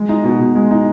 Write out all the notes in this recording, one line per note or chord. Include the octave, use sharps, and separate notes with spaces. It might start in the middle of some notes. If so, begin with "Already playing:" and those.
Already playing: G#3
D#4
B2
B2
G#3
D#4